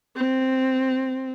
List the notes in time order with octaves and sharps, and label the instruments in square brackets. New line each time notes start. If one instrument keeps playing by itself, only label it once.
[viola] C4